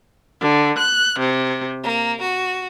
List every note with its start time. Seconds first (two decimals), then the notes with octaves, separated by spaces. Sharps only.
0.41 D3
0.79 F#6
1.20 C3
1.82 A#3
2.20 F#4